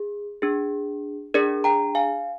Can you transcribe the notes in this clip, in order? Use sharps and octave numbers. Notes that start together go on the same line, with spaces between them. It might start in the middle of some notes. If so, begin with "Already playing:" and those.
Already playing: G#4
D4 G#4
D4 G#4 A#4 D5
G5 A#5
F5 G#5